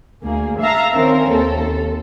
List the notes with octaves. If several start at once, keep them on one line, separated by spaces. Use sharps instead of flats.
D2 A#3 G#4
E5 F5 A5 A#5
D#3 C4 C#4 A#4
D#2 A4